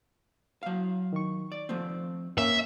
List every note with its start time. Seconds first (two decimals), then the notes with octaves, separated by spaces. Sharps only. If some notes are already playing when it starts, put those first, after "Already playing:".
0.63 F#3 F5
1.13 D#3 C#6
1.52 D5
1.69 F3 A3 C4
2.38 A#3 C#4 E5